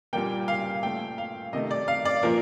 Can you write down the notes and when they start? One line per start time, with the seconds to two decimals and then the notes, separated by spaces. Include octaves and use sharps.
0.13 A#2 G3 A#3 G5
0.48 F5
0.83 A#2 A3 G5
1.18 F5
1.53 C3 D#3 A3 D#5
1.71 D5
1.88 F5
2.05 D5
2.23 A#2 F3 A#3 A#4